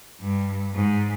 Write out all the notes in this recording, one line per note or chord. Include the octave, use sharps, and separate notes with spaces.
G2
G#2